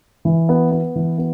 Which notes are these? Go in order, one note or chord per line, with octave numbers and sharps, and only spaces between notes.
E3
B3
B3
E3
B3